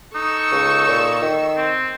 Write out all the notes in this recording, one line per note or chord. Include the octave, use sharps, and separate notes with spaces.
D#4 A4 C#6 E6
C#2
A#2
D#3
C4